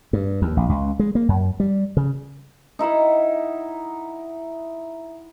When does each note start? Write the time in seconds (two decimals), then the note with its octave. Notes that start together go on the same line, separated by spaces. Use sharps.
0.13 G2
0.42 D#2
0.57 A#1
0.69 C#2
0.99 G#3
1.15 A#3
1.29 F#2
1.60 G3
1.97 C#3
2.79 D#4 E4 E5 F#5